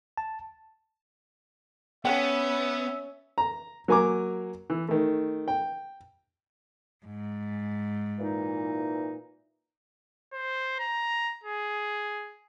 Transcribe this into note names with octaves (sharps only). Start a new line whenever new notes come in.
A5
B3 C#4 A4 E5 F#5 G5
A#5
F#3 A#3 G#5 A#5 D6
E3
D#3 A3
G5
G#2
A#2 E3 D#4
C5
A#5
G#4